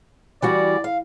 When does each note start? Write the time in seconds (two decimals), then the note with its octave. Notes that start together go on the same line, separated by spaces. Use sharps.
0.42 E3 G3 F#4 D5
0.84 F5